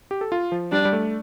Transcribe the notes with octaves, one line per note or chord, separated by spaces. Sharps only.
G4
A4
F4
F3
G3 D4
G3
A3